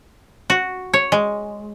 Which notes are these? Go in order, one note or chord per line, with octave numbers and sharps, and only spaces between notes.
F#4
C#5
G#3